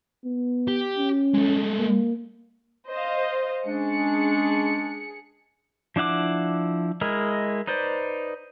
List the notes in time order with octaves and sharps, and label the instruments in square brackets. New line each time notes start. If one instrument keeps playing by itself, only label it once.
[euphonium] B3
[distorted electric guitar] G4
[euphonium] C#4
[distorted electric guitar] G#3 A3
[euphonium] A#3
[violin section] C5 D#5 F5
[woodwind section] G#3 C#4 D4 [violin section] G#4 C#7
[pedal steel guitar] F3 D4 E4 F#5 D6
G#3 E4 A#4 D#5
D#4 B4 C5 D5